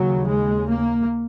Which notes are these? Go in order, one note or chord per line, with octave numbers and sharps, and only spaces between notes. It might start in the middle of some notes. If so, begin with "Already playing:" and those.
Already playing: D#2 C#3 F#3
G#3
A#3